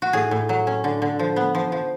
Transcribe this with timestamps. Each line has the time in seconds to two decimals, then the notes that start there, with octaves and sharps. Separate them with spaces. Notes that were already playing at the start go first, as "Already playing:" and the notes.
0.02 F#4
0.13 A2 G#4
0.31 A2
0.49 F#3
0.67 C#4
0.84 D3
1.02 D3
1.19 F3
1.36 B3
1.55 F3
1.72 F3